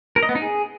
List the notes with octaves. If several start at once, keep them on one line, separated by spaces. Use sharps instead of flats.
A#4
D#5
B3
D#4
G#4